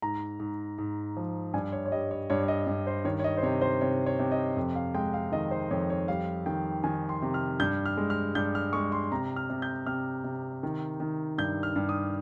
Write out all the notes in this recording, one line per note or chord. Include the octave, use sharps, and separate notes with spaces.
G#2 A#5
G#2
G#2
F3
G2 G#5
C#5
C#5
G3 D#5
C#5
G2 C#5
C#5
D#5
G2
C5
D#3 C#5
C#5
D#5
C5
C3 C#5
C5
C3 C#5
C#5
C3
D#5
F2
F5
G#3 G5
F5
D#3 D#5
C5
F2 C#5
C#5
G3 F5
D#3 G5
D#3 G#5
C6
C3
F6
G2 G6
F6
G#3
F6
G2 G6
F6
G#3 C#6
C6
C3 A#5
F6
C3
G6
C3 F6
C3
D#3
D#3
G2 G6
F6
G2
D#6